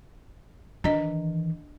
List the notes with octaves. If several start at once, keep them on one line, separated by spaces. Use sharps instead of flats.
D#3 E3 D4 D#5